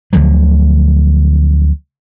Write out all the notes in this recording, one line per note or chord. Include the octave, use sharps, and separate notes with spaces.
D2 D3 F3 F#3